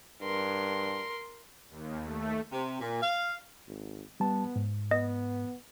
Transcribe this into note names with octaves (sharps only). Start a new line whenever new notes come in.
G2 A#4 C6
D#2
A3
C3
A#2
F5
G#1
G3 B3 A5
G#2
B3 D#5